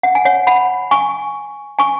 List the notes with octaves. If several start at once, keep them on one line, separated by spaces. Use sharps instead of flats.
F#5
G#5
C#5 F#5
F#5 B5
G#5 C#6
G#5 C#6